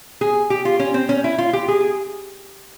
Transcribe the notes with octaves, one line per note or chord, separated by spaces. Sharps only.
G#4
G4
F4
C#4
C4
C#4
E4
F4
G4
G#4